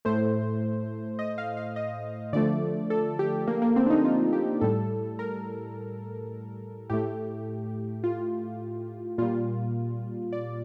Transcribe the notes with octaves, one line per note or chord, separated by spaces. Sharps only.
A2 A3 C5
D#5
F5
F5
D#5
D3 F3 A3 D5
A4
G4
A#3
A#3
C4
D4
D#4
F4
G4
A2 G3 A4
A#4
A2 A3 G4
F4
A#2 G3 F4
D5